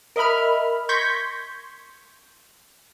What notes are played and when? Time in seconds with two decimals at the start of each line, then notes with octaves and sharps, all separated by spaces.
0.16 A#4 D#5 E5 B5 F6
0.89 C6 C#6 G6 G#6 A#6 B6